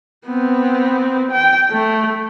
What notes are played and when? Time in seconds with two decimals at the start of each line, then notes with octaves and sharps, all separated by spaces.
0.26 B3 C4
1.31 G5
1.71 A3